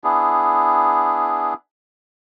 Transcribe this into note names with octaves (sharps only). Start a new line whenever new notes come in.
B3 D4 E4 G#4